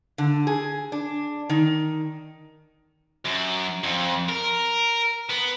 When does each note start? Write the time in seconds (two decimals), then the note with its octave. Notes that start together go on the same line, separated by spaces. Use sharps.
0.18 D3
0.47 G#4
0.92 D4
1.50 D#3
3.25 F#2
3.84 F2
4.29 A#4
5.29 B3